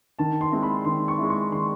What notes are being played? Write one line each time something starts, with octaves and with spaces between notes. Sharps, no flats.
D#3 A5
C6
G#3 C4 E4
B5
D#3 C6
C#6
G#3 C4 E4
C#6
D#3 C6